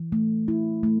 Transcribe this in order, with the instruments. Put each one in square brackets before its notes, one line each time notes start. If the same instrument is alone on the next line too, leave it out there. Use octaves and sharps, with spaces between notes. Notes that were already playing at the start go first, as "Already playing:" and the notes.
Already playing: [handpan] E3
A3
E4
A3